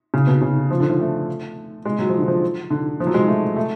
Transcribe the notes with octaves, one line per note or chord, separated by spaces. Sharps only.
C#3
B2
C#3
F3
D3
F3
A3
G#3
F#3
F3
D3
F3
D3
F3
F#3
G#3
A3
A3